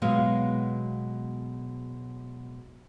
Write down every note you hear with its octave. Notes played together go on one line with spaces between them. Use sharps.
B2 F#3 G#3 B3 F5